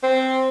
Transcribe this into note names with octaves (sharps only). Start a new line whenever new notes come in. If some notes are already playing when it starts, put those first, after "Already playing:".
C4